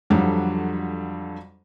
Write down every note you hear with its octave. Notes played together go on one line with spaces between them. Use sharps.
F2 D3 F#3 G3